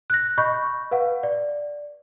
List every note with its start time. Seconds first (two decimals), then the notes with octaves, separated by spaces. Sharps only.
0.10 F#6 A#6
0.38 D#5 B5 C#6 G6
0.91 B4 F5 F#5
1.23 D5